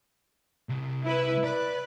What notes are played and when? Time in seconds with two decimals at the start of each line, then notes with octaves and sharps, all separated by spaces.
0.69 C2
1.04 E4 B4 E5
1.44 B4 D5